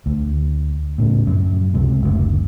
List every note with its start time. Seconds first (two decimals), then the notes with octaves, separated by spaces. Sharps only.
0.06 D2
0.98 A2 C#3
1.27 F#2
1.74 C#2 C3 G#3
2.02 F#1 D2